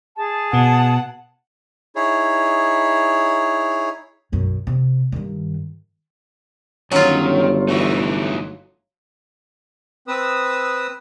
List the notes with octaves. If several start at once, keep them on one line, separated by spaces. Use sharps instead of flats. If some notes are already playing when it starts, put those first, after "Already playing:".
G#4 A5
B2 F#5
D#4 E4 G#4 C#5
B1 F#2
C3
G2 D#3
G1 D#3 F#3 C#4 F4
E3 A3 D#4 E4 F#4
C4 B4 D#6 E6